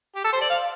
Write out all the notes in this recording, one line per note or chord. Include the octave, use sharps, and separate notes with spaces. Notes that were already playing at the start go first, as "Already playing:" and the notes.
G4
A4
C5
D5
F5